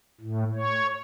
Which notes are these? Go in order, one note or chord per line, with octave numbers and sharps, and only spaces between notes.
A2
C#5